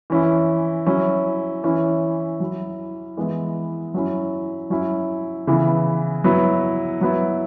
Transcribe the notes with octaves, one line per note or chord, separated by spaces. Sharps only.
E3 C#4 E4
F#3 C#4 E4
E3 C#4 E4
F#3 E4
E3 G#3 B3 E4
F#3 C#4 E4
F#3 C#4 E4
C#3 E3 B3 E4
F#3 B3 E4
F#3 B3 E4